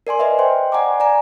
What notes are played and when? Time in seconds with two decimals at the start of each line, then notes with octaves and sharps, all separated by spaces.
0.07 A#4 D5 G#5 C6
0.19 B4 D#5 E5
0.38 C5 D#5 G5 C6
0.72 D5 F#5 G#5 A#5 D6
1.00 D5 G#5 A#5